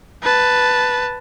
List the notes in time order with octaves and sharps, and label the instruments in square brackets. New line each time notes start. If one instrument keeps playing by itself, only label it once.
[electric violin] B4 A5